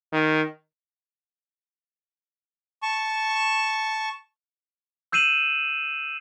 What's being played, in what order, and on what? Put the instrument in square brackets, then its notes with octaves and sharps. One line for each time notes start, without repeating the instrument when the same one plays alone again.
[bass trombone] D#3
[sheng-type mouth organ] A5 C#6
[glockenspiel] E6 G6 C7 D#7 E7 F#7